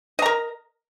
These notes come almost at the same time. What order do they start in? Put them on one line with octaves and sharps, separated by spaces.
D#5 A#5 A#4